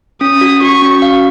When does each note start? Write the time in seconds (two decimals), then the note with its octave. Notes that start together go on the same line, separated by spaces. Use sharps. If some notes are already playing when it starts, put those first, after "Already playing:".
0.21 C#4 D#6
0.41 F#4
0.61 F#4 C#6
0.82 C#4
1.02 F5